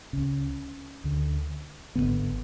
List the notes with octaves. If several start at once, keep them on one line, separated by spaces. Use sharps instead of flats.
C#2 C#3 C#4
D2 D3
F#2 D3 B3
G#1